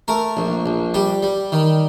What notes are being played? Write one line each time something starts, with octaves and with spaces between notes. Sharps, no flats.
A3 A#4
A#1
A#1
G3 G4
G3
D#3